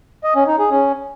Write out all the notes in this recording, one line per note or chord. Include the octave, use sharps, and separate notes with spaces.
D#5
C#4
D#4
G#4
C#4